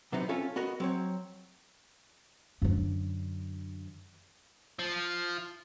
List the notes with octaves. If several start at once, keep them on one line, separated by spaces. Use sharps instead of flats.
C3 F#3 B3 C4 D#4
C4 C#4 F4 A4 C#5
B3 F#4 A#4 D#5
F#3 C4 C#5
F#2 D3
F3